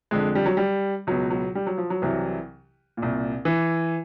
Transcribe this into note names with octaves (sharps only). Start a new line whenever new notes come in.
F2 D3 G#3
G3
F#3
G3
C#2 B2 F#3
F#3
G3
F#3
F3
F#3
C2 C3 E3
A#2
C2
E3